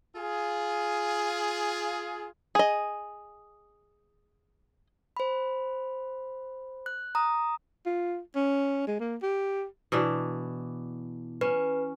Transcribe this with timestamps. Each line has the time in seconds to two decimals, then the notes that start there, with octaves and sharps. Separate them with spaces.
0.16 F4 G#4
2.55 G#4 D#5
5.17 C5 B5
6.86 F#6
7.15 A#5 D#6
7.86 F4
8.35 C#4
8.87 G#3
9.00 A#3
9.22 G4
9.92 B2 E3 D4
11.41 C#4 B4